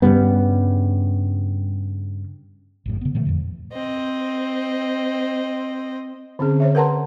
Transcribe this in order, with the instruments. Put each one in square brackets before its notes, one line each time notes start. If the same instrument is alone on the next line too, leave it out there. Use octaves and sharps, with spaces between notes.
[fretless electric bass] G2 C#3 G3 B3
G#1 F#2 A2
C#3 B3
A#2 D3 E3 A3
F2 A#2 F3
[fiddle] C4 D#5
[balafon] D3 C4 C#4 G#4
C5 C#5 E5
A#4 B4 F#5 A5 A#5 C6